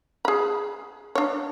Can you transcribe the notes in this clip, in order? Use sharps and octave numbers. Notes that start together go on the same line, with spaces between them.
G#4 B5
D4 C#5